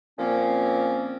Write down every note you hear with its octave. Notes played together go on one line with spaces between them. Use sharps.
A#2 F3 A#3 C4 C#4